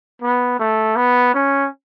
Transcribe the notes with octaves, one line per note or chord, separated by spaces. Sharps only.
B3
A3
B3
C#4